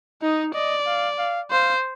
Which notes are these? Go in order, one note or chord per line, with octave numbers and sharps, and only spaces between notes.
D#4 D#5
D5 D#5
F5
F5
C5 F5